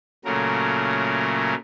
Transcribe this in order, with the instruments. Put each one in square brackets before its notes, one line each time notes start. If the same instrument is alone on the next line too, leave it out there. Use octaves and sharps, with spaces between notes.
[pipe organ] A#2 C#3 F#3 A3 A#4